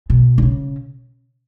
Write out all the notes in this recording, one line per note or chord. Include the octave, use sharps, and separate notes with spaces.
B2
D3
C#3